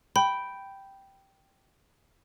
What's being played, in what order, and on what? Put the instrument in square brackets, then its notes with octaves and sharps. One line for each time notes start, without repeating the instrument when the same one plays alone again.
[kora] G5 [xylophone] B5